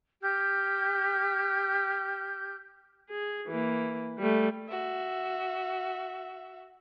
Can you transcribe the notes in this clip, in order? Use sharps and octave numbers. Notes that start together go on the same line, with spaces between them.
G4 F6 G6
G#4
E3 A#3
G3 A3
F#4 E5